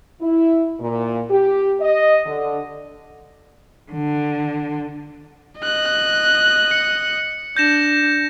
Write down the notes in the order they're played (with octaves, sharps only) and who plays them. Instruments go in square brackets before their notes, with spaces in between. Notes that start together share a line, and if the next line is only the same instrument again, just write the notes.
[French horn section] E4
A#2
G4
D#5
D3
[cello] D3
[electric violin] D#5 F#6
[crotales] C#7
[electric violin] D4 [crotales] G6 A#6 E7